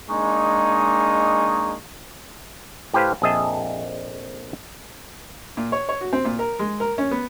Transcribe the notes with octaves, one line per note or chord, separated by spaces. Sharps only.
G#3 A#3 D4 D#4 G#4 C#6
A2 G4 B4 C5 F5
A#1 F2 G#4 D#5 E5 A5
A#2
C#5
C#5
F#4
C4
A#2
A#4
G#3
A#4
C#4
B3